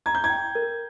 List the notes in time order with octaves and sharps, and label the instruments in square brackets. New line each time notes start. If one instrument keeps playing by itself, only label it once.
[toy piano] A#5 [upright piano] G#6
[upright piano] G6
G#6
[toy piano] G5
A#4